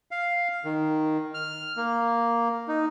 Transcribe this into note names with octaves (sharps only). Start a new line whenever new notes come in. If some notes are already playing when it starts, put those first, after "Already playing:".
F5
D#3
F6
A#3
D#4